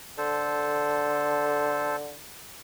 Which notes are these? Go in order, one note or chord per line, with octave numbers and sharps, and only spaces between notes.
D3 A4 C5